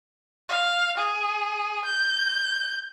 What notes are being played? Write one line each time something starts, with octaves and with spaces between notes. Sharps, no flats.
F5
G#4
G6